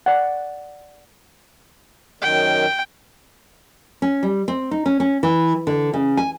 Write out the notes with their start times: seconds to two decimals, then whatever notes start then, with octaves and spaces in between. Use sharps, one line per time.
0.06 D5 F#5
2.21 F#2 D#3 G5
4.02 C#4
4.23 G3
4.48 C4
4.71 D#4
4.86 C#4
5.00 C#4
5.23 E3
5.67 D3
5.93 C#3
6.17 G#5